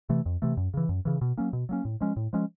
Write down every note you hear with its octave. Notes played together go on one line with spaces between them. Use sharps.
C3 E3 A3
F2
C3 E3 A3
F#2
C#3 E3
F#2
C#3 E3
B2
F#3 A#3 C#4
B2
F#3 A#3 C#4
A2
F3 G#3 C#4
A2
F3 G#3 C#4